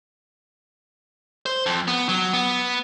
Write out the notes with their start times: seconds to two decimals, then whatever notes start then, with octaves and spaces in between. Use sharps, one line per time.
1.46 C5
1.66 F2
1.88 B3
2.09 F#3
2.33 B3